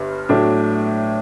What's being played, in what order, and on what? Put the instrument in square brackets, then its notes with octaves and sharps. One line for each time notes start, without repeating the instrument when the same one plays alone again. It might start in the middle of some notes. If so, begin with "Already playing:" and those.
Already playing: [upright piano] G1 G2
A2 F#3 A3 D4